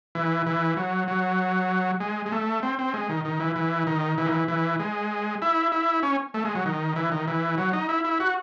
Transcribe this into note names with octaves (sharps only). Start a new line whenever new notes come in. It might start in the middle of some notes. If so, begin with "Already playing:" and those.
E3
E3
F#3
F#3
G#3
G#3
A3
C4
C4
G#3
D#3
D#3
E3
E3
D#3
E3
D#3
E3
E3
G#3
E4
E4
C#4
A3
G#3
F#3
D#3
E3
D#3
E3
F#3
D#4
E4
E4
F#4